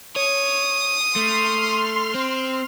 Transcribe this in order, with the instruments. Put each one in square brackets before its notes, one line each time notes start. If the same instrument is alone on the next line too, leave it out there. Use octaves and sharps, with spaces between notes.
[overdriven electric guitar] C#5 [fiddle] D#6
[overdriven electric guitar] A3 [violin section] C6 F6
[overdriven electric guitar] C4